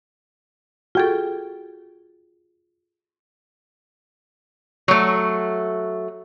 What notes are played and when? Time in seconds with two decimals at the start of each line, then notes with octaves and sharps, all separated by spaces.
0.95 F4 F#4 G#4 A4 G5
4.88 F#3 A3